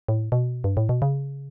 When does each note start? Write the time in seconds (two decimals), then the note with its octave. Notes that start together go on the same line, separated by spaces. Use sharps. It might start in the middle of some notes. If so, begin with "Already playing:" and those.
0.08 A2
0.32 B2
0.64 G2
0.77 A2
0.89 B2
1.02 C#3